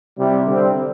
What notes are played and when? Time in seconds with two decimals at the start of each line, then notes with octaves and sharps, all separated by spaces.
0.18 C3 G3 E4
0.46 D3 G3 C4